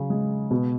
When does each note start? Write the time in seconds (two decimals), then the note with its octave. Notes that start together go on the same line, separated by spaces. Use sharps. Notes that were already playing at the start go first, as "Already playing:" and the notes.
Already playing: C#3 F#3
0.10 G#3
0.51 B2